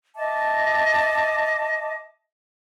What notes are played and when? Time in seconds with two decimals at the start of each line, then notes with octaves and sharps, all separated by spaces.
0.16 D#5 E5 A5 D6